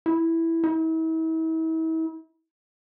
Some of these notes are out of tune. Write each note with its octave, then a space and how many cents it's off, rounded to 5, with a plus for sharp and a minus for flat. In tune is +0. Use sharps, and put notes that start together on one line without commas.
E4 +0
E4 -40